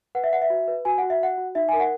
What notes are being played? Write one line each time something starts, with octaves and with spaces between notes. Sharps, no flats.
B4 F#5
E5
B4 F#5
E5
F#4
B4
F#4 G#5
F#4 F#5
E5
F#4 F#5
F#4
D#4 E5
A#4 G#5
F#5